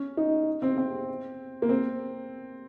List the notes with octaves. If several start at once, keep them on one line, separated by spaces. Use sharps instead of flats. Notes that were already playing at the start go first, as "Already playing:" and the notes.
Already playing: C#4
D#4
C4
C4
A#3
C4